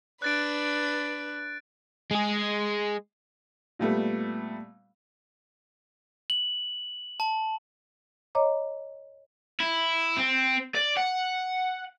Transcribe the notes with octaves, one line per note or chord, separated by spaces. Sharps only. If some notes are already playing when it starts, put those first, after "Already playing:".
D4 B4 F#6 A6 D7
G#3 G#4
A#2 G3 A3 B3
F#7
A5
C#5 D#5 A#5 D6
E4
C4
D5
F#5